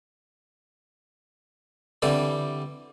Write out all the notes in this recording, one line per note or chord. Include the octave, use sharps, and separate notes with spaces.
D3 E3 G3 C4 A4 D5